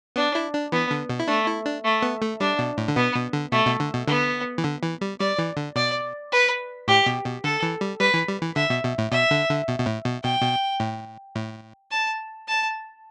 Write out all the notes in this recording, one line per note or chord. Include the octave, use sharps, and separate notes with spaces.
B3 D4
E4
D4
E3 B3
D3
B2
E4
A3 D4
E4
D4
A3
B3
A3
G3 D4
B2
A2
D3
B2 B3
B2
D3
B2 A3
B2
D3
B2
D3 B3
E3
D3
E3
G3
G3 D5
E3
D3
B2 D5
B4
A2 G4
B2
B2
D3 A4
E3
G3
G3 B4
E3
G3
E3
D3 E5
B2
B2
A2
B2 E5
D3
D3
B2
B2
A2
B2
B2 G5
B2
A2
A2
A5
A5